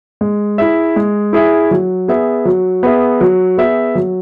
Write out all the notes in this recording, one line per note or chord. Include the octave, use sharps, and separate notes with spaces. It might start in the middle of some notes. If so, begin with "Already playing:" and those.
G#3
E4 G#4 E5
G#3
E4 G#4 E5
F#3
B3 G#4 E5
F#3
B3 G#4 E5
F#3
B3 G#4 E5
F#3